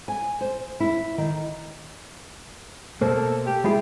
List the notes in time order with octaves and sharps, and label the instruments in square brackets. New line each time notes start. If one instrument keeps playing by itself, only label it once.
[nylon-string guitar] G#5
C5
E4
D#3
[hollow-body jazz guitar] B2 A3 A#3 [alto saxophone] A4 [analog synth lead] C5
[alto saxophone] G4
[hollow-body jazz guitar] G#3 F4 G#4 [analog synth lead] E4